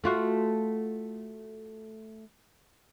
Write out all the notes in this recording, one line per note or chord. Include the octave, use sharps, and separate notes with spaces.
A3 F4 F#4